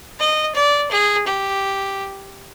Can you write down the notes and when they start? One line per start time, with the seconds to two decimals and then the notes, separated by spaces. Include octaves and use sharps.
0.20 D#5
0.55 D5
0.91 G#4
1.27 G4